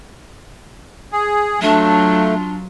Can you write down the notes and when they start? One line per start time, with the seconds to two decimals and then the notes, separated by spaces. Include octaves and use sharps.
1.12 G#4
1.61 F#3 A3 D4 F4